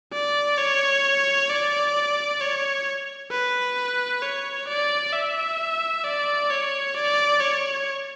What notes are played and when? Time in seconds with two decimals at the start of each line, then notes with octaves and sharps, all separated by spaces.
0.13 D5
0.58 C#5
1.49 D5
2.41 C#5
3.31 B4
4.22 C#5
4.68 D5
5.13 E5
6.04 D5
6.50 C#5
6.95 D5
7.40 C#5